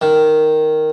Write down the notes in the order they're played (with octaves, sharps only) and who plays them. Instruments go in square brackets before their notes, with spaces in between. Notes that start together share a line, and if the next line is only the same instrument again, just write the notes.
[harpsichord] D#3